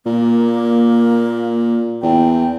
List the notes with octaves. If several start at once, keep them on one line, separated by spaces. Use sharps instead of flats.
A#2 A#3
E2 G5